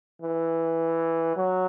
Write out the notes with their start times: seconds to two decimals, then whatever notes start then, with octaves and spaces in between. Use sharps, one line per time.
0.22 E3
1.36 F#3